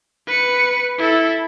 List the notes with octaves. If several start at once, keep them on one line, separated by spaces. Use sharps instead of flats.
B4 C#7
E4 A4